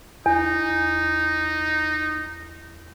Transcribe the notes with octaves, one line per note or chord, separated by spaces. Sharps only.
E2 D#4